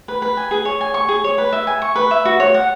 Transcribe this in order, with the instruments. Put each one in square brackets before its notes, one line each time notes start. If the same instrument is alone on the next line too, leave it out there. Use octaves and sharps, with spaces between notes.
[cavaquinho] B4
B4
G#5
G#4
C#5
G#5
C#6
G#4
C#5
B4
E5
G#5
C#6
B4
E5
F#4
C#5
F#5